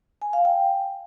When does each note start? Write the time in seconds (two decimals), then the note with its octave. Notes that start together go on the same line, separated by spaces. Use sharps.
0.22 G#5
0.33 F5
0.45 G5